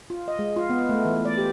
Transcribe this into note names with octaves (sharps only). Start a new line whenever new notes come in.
F4
D#5
G#3
F4
B3
A3
E3
D5
G4